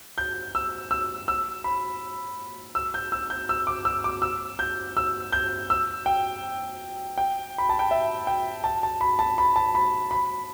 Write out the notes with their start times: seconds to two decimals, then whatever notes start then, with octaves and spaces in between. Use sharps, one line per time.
0.18 G6
0.55 E6
0.91 E6
1.28 E6
1.64 B5
2.75 E6
2.94 G6
3.12 E6
3.30 G6
3.49 E6
3.67 D6
3.85 E6
4.04 D6
4.22 E6
4.59 G6
4.97 E6
5.32 G6
5.70 E6
6.06 G5
7.18 G5
7.58 B5
7.69 A5
7.79 G5
7.91 E5
8.27 G5
8.64 A5
8.83 A5
9.01 B5
9.19 A5
9.38 B5
9.56 A5
9.75 B5
10.11 B5